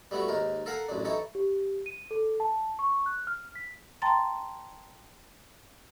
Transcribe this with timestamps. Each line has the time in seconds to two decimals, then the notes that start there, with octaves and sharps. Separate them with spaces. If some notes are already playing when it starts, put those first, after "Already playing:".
0.11 G3 A3 B3 E4 F#4
0.28 D#2 G#2 A#4
0.66 A4 A#4 F5 F#5 G#5 A#5
0.89 A1 F#2 D4
1.05 E3 D#4 A4 C#5
1.35 G4
1.86 D#7
2.11 A4
2.40 A5
2.79 C#6
3.06 F#6
3.27 F6
3.55 B6
4.02 G5 A5 A#5 C6 A6